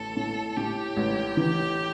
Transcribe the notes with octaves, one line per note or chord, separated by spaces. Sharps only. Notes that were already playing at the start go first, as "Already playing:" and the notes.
Already playing: A1 A4
A2
A2 G4
A1
E3